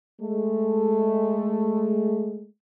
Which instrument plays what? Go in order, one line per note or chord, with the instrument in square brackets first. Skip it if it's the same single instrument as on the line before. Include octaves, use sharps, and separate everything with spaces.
[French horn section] G#3 A3